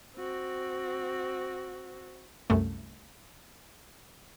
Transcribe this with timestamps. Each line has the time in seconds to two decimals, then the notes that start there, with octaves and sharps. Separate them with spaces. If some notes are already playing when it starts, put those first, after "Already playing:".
0.16 C4 F#4
2.50 C2 F#2 A3